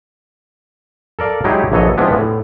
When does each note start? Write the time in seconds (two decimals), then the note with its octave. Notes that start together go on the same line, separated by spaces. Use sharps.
1.19 A4 A#4 D5 F5
1.44 F#3 G#3 D#4 E4 G4 G#4
1.72 A#1 E3 F#3 A4 C#5 D#5
1.97 E3 F3 G#3 B3 C4 D4
2.13 A2